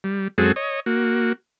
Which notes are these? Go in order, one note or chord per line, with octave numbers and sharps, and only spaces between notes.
G3
F#2 G#3 C4 F#4 G#4 A4
C#5 D#5
A#3 F#4